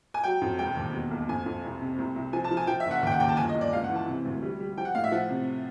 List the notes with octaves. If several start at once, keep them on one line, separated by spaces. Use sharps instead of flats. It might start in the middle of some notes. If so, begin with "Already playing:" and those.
G#5
F#3 G5
F2
E1 G5
D#2
B2
B1
F2 G#5
F2
C2
C3
C2
C2
F3 G#5
A5
F3
G#5
F3 G5
E5
F#1
F#5
D#2 G5
F#5
D#2 G5
A5
G1 G#5
D#5
G1
D5
C#2 F5
F#5
E3
A5
C3
D2
G3
G3
F3 G5
F#5
A2 F5
E5
F3 F#5
C3